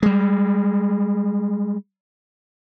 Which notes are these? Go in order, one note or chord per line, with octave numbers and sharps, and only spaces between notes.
G3 G#3